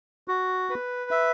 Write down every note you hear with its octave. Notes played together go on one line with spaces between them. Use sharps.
F#4
B4
E5